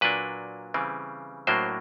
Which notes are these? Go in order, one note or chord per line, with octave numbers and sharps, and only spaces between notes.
A#2 F#3 A#3 D4 B4
C#3 E3 G3 C4
A2 F#3 A#3 D4 C5